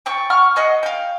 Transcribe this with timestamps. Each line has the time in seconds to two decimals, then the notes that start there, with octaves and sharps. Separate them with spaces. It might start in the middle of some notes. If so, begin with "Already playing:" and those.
0.06 G5 A5 C#6
0.30 F#5 C#6 F6
0.56 G#4 D#5 F#5
0.83 F5 G5